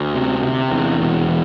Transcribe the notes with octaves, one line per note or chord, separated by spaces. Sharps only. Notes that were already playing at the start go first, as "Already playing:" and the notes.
Already playing: D2
C3
C3
E2
E1
E3